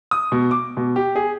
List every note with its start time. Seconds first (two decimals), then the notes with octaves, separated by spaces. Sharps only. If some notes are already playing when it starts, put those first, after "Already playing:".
0.11 D#6
0.32 B2
0.51 D6
0.77 B2
0.96 G4
1.16 G#4